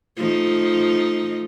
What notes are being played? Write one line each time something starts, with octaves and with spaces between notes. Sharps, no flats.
F3 A3 D#4